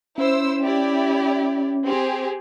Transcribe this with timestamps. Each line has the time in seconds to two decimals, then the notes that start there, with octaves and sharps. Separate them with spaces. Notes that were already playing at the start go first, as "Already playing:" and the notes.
0.18 C#4 E4 C5 E6
0.62 E4 G4 D5
1.86 C4 G4 G#4